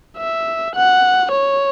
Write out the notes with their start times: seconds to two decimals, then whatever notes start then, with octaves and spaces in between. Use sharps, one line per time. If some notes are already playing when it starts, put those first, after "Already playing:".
0.17 E5
0.75 F#5
1.31 C#5